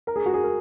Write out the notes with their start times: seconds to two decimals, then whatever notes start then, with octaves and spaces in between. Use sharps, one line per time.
0.07 A#4
0.16 G#4
0.26 F#4
0.34 G#4
0.43 A#4